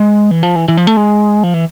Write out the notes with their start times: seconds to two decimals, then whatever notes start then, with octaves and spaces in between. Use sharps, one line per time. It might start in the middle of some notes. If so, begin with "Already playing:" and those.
Already playing: G#3
0.31 E3
0.43 F3
0.56 E3
0.68 E3
0.77 F3
0.87 A3
0.97 G#3
1.43 F3
1.54 E3